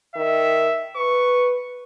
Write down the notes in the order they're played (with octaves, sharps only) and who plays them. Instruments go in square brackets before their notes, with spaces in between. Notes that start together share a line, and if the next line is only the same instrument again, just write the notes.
[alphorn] D#3 [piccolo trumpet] E5
[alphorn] B4 [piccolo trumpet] C#6